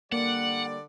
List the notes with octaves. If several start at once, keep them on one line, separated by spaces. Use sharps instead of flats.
D3 G3 A#3 D5 F#5